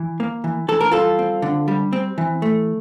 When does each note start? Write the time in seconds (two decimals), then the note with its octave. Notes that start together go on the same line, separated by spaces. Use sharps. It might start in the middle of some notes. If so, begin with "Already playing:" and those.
Already playing: E3
0.20 A#3
0.44 E3
0.68 E3 A4
0.81 A#4
0.91 G3 F4 A4
1.19 C4
1.42 D3
1.68 G3
1.93 C4
2.18 E3
2.42 A3